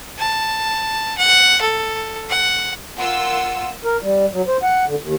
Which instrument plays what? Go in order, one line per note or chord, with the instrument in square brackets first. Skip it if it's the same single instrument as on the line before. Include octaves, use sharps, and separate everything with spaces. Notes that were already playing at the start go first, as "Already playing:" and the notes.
[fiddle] A5
F#5
A4
F#5
[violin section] A#3 F4 E6 [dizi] F#5
[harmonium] A#4
G3
F#3
C5
F#5
D3
D#2